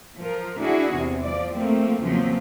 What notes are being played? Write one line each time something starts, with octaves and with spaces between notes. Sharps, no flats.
F3 A#4
D4 E4 F#4 G#4
E2 C3
F3 D5
F3 A3 A#3 C4
E2 C#3 F3 F#3 A#3 C4